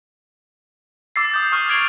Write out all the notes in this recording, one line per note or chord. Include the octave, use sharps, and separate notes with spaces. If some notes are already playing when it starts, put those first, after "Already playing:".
D6 E6 A6 C7
D#6 G6 A6
C#6 D#6 F6
F6 G#6 C7 D7 F7 F#7